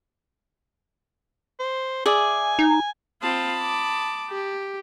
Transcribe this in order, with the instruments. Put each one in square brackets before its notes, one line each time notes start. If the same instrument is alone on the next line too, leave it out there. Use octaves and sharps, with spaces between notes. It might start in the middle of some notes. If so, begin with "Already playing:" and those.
[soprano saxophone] C5
[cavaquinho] G#4 D5 E5 [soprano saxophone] G#5
[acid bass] D#4
[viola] C4 F4 [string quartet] A5 B5 D#6
[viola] D6
G4